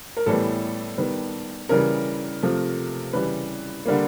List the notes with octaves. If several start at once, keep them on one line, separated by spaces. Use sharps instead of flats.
A#4
A2 E3 G3 B3 A4
D#3 G3 B3
C#3 E3 G3 A#4
C3 F3 A3
C#3 E3 G3 B4
D3 G3 A#3